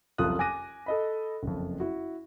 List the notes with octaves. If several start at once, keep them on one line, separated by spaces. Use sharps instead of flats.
F#1 C2 F2 F4 D#6 F#6
G#5 D6 F#6 A#6 D#7
A4 D#5 B5
F#1 F2
E4 F#4